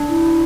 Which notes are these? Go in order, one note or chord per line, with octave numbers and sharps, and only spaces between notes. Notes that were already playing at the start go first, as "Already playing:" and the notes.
Already playing: D4
E4